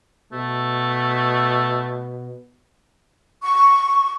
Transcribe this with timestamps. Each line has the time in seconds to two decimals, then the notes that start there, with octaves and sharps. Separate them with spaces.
0.32 B2 A3
3.42 C#6